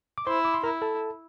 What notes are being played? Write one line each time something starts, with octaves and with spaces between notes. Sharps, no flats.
D6
E4 C5 C6
D6
C6
E4 A#4 A#5
A4 A5